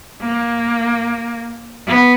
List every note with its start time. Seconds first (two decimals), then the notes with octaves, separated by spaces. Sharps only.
0.22 A#3
1.86 B3